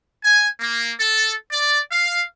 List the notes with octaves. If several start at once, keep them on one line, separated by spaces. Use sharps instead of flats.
G#5
A#3
A4
D5
F5